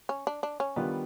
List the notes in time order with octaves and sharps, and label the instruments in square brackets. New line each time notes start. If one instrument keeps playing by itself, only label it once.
[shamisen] C#4
D4
D4
C#4
[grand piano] D#3 G3 B3 D4 F4